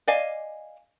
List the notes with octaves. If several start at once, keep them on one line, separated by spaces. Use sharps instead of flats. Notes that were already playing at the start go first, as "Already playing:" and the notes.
D5 D#5 F5 G#5